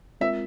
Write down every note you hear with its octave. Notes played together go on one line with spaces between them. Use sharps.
G#3 C4 F4 A#4 E5